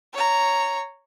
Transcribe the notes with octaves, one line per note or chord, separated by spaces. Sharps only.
C#5 A#5